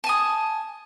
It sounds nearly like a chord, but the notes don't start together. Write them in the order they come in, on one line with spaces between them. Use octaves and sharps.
A5 G#5 D#6